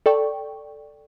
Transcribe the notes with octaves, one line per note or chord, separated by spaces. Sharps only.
A4 D5 G5 C#6